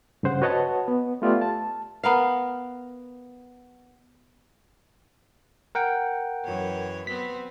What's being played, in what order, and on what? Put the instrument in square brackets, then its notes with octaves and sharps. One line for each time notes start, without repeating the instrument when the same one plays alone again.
[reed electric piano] G2 C#3 C5 F#5
F#4 B4 C#5 D#5 F#5 A5
B3
A3 B3 F4 G4 D5 E5
A5
[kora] B3 A#4 F5
[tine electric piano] A#4 F#5 G5
[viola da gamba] F#2 E3 C#5
[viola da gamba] F#3 B3 C4 [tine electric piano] B6